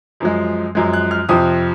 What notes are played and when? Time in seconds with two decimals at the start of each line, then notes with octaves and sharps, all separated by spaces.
0.20 F#2 F3 G#3
0.75 F#2 F3 G#3
0.93 F#6
1.11 F6
1.29 F2 C3 F3 D#6